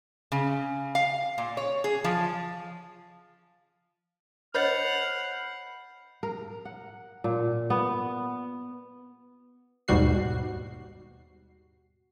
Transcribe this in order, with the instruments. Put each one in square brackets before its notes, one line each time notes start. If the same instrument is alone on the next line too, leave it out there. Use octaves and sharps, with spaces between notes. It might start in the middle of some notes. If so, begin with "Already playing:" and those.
[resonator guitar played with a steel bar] C#3
F5
A#2
C#5
G#4
F3
[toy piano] C5 C#5 D#5 [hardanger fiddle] F#5 [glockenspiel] B5 G6 C7 [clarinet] F6
[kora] A#4
F#5
A#2
B3
[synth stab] D#2 G#2 B2 G3 F#4 C7